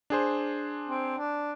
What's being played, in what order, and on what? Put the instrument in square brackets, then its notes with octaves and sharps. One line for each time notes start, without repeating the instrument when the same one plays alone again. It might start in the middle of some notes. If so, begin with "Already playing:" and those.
[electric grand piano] D4 G#4 C5
[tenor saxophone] C4
D4